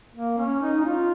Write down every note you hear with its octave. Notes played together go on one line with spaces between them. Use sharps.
A#3
C#4
D#4
D#4
F4